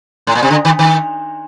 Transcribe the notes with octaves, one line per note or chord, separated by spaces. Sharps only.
A2
A#2
C3
D3
D#3
D#3